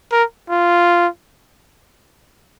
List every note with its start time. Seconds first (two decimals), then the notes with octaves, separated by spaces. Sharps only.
0.12 A#4
0.49 F4